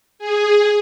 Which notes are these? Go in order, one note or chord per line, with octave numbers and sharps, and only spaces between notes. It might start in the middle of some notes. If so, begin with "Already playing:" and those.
G#4